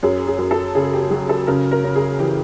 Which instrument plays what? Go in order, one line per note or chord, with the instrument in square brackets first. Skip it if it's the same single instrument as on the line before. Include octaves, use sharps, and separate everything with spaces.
[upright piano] F#2 [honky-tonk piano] G#4
[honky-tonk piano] G#4
[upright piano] F#2
[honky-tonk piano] A4
[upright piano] C#3 [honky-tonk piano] G#4
[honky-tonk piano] G4
[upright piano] F#3 [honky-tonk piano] G#4
[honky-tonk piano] A4
[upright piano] C#3 [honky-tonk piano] A#4
[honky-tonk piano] A#4
[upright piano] C#3
[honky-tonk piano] G#4
[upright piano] E3 [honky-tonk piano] G4